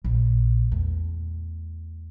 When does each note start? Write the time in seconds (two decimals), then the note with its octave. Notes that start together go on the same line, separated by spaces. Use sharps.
0.04 A#1
0.72 E2 A3